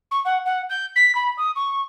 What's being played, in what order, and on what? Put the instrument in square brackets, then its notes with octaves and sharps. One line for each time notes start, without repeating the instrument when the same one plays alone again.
[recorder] C#6
F#5
F#5
G6
B6
B5
D#6
C#6